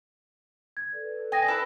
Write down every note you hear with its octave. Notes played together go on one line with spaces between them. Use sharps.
G#6
A4 B4 D5
G5 G#5 D#6 A#6
E4 A4 B4